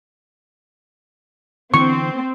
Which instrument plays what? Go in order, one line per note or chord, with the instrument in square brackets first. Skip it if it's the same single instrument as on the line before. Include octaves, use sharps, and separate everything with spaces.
[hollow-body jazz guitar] D3 E3 B3 [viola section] C4 [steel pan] C#6